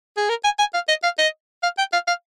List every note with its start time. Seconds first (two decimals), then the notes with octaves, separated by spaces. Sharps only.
0.17 G#4
0.29 A#4
0.44 G#5
0.59 G#5
0.74 F5
0.88 D#5
1.03 F5
1.18 D#5
1.63 F5
1.78 G5
1.93 F5
2.08 F5